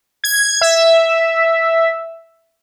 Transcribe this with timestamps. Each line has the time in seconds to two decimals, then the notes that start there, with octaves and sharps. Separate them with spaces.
0.24 G#6
0.61 E5